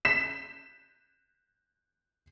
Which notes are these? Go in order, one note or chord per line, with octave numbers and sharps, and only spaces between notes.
B6 E7